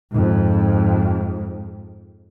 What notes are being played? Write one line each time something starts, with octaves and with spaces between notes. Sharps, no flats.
F2 G#2